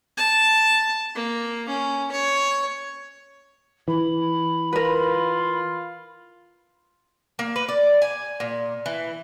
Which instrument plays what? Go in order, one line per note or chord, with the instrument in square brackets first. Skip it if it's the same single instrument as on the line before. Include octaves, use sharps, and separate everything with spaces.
[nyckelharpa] A5
A#3
C#4
C#5
[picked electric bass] E3 [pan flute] B5
[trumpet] F4 [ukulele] A#4 B4
[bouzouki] A#3
B4
D5
G#5
A#2
E3